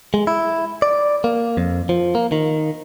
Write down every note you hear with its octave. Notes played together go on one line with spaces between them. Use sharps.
G#3
E4
D5
A#3
F2
F3
A#3
D#3